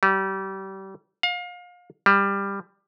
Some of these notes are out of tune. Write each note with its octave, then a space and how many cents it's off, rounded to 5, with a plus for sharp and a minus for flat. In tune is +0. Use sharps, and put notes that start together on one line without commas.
G3 -30
F5 +30
G3 +15